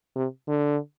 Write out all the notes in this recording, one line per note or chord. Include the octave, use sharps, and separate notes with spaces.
C3
D3